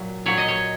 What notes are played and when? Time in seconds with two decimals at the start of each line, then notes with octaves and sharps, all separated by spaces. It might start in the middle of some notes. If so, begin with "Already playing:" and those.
Already playing: A#2 F#3
0.26 A#2 F#3 C#5
0.37 D#5
0.48 C#5